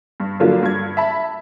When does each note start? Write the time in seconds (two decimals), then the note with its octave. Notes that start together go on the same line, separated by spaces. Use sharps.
0.20 G2
0.40 D3 F3 F#3 A#3 D4 F4
0.63 G2 G#6
0.97 E5 A5 B5